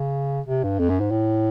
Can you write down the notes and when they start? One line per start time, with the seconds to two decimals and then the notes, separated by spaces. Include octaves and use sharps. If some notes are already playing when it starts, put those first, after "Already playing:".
Already playing: C#3
0.47 C3
0.63 G2
0.79 F2
0.89 F#2
1.00 G#2
1.11 A2